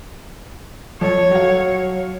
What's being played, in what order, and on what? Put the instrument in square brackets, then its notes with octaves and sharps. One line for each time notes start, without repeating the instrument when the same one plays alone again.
[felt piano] F2 [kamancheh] C#5
[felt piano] F#3 F5